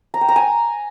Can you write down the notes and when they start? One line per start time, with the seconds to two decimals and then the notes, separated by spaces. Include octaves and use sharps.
0.14 A#5
0.21 G5
0.29 A#5
0.36 G#5